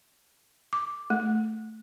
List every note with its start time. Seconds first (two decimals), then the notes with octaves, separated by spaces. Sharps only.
0.73 D6
1.10 A3